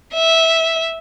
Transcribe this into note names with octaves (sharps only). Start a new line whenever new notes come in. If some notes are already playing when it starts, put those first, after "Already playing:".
E5